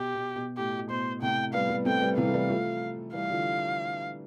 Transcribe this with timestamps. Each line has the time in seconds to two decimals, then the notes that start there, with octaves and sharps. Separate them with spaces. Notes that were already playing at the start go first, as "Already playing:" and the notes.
Already playing: B2 G4
0.15 B2
0.36 B2
0.57 A2 G4
0.89 B2 C5
1.22 A2 C3 G5
1.53 G3 B3 F5
1.70 G3 B3
1.85 A3 C4 G5
2.02 G3 B3
2.17 C3 E3 F5
2.27 A3
2.34 E3 G3
2.49 F3 A3
3.13 E3 G3 F5
3.30 D3 F3